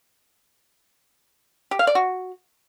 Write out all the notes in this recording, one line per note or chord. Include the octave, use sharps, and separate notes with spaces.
G4
F5
D5
F#4